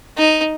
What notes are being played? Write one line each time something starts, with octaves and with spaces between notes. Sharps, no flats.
D#4